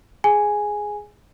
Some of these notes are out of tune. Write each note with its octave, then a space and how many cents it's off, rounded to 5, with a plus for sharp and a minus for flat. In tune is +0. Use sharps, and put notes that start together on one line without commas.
G#4 +5 G#5 +0